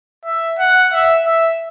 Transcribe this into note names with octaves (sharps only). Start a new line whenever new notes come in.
E5
F#5
E5
E5